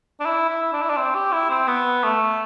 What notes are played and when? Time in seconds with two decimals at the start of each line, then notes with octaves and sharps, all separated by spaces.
0.20 D4
0.25 E4
0.49 E4
0.72 D4
0.82 E4
0.89 D4
0.96 C4
1.15 G4
1.32 E4
1.50 C4
1.67 B3
2.03 A3